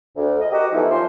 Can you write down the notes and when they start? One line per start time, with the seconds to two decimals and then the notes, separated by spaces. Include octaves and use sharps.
0.16 D2
0.41 D#5
0.52 F#4 G4 A#4 D#5
0.73 E3 F3 A3 B3 D#4 E4
0.91 F#2 F3 C5